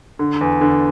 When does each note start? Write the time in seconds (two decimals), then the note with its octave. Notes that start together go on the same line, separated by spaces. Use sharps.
0.19 D3
0.41 E2
0.61 D3